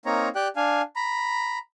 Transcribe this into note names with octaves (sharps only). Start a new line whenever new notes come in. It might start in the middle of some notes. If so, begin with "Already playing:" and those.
A#3 C4 D#4 C#5 A#5
G4 D5 G5 F#6
D4 F5 G#5
A#5 B5